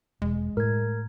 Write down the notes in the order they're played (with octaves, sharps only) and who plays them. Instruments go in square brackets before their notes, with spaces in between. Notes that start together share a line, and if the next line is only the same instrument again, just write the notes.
[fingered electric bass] E1 [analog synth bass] G#3
[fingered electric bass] A2 [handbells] A#4 G#6